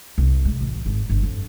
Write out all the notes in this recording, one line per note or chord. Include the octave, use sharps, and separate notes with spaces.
C2
G#3
A1
G#1
G1
F2